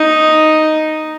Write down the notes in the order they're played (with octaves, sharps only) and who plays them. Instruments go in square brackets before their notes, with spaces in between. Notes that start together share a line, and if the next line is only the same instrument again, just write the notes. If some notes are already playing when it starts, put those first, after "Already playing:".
Already playing: [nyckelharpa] D#4